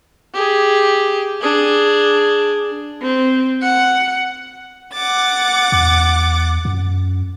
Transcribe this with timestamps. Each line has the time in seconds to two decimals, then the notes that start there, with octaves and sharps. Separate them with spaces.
0.34 G4 G#4
1.41 D4 G#4
3.01 C4
3.61 F#5
4.95 F#5 D6 A6
5.72 E2
6.65 F#2